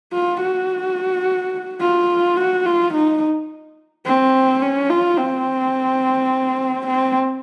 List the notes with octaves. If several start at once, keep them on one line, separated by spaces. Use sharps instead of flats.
F4
F#4
F4
F#4
F4
D#4
C4
C#4
F4
C4
C4